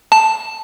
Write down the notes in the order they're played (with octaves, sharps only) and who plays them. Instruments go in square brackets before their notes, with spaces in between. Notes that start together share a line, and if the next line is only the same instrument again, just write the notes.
[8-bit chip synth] A5